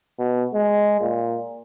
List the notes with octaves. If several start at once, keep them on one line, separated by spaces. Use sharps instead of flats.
B2
G#3
A#2